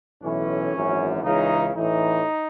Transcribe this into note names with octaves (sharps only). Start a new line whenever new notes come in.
B1 A2 E3 C#4
G#1 F#2 E3
C#2 C#3 E3 D#4
A1 A2 E3 D#4